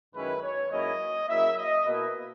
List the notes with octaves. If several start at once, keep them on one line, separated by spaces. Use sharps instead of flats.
F#2 D#3 G#3 C#4 E4 B4
C#5
G#2 F#3 A#3 C#4 E4 D#5
C#3 F#3 A#3 E4 E5
D#5
B2 A#3 E4 B4